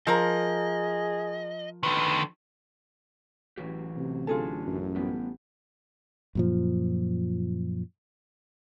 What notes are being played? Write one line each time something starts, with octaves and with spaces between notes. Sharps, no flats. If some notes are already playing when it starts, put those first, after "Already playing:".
F3 G#4 A#4 D#5
D3 D#3 B4
A1 E3 F#3 G4
A1 C3
D3 F#3 F4 G#4 A4
A1 F#2
G3 B3 G4
F#2 A#2 F3